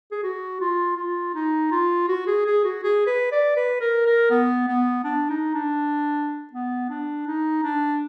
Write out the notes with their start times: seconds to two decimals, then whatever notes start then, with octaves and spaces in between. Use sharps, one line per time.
0.12 G#4
0.23 F#4
0.61 F4
0.97 F4
1.35 D#4
1.71 F4
2.08 F#4
2.27 G#4
2.46 G#4
2.65 F#4
2.83 G#4
3.07 B4
3.32 D5
3.56 B4
3.81 A#4
4.06 A#4
4.31 B3
4.68 B3
5.04 D4
5.30 D#4
5.54 D4
6.53 B3
6.90 D4
7.27 D#4
7.63 D4